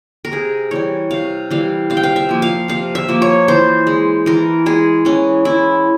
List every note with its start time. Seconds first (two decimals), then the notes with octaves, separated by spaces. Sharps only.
0.25 A#4
0.32 C3 G#4
0.71 E3 G3 C#5
1.11 C3 F5
1.50 E3 G3 F5
1.90 C3 F5
1.97 G5
2.03 F5
2.16 E5
2.29 F3 A#3
2.42 F5
2.68 C3 F5
2.95 E5
3.09 F3 A#3
3.22 C#5
3.48 E3 C5
3.87 G#3
4.26 E3 A#4
4.66 G#3 G#4
5.05 E3 C#4
5.45 G#3 E4